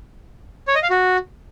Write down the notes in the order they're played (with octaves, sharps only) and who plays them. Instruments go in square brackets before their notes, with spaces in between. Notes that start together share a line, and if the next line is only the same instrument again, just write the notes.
[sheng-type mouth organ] C#5
D#5
F5
F#4